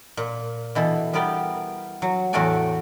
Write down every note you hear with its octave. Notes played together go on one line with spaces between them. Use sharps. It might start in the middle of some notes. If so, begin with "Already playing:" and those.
A#2
B2 E3 A4
G3 B3 A#4 D5 G5
F#3
E2 A2 A3 F#4 D5 G#5